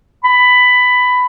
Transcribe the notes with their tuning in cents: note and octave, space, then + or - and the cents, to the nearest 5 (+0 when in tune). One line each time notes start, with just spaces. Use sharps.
B5 +10